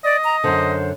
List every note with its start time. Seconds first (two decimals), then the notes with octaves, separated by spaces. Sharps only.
0.04 D5 D#5
0.24 A#5
0.44 F#2 D3 C5